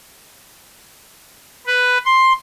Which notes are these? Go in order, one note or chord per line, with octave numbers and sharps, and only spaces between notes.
B4
C6